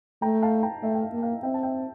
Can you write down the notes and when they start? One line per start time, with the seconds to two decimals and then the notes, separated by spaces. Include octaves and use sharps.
0.22 A3 G5 A#5
0.42 F5 A5
0.63 G5 A#5
0.83 A3 E5
0.95 G5
1.03 F5
1.13 A#3
1.23 F5 A5
1.43 C4 E5 G5
1.54 A5
1.63 E5 G5